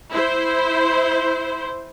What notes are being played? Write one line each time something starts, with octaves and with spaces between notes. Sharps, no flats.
E4 C5